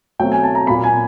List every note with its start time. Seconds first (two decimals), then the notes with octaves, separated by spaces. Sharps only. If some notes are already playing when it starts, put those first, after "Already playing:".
0.19 B2 F#3 A3 C4 G5
0.32 G#5
0.43 A5
0.55 A#5
0.67 A#2 F#3 A#3 B5
0.84 G#5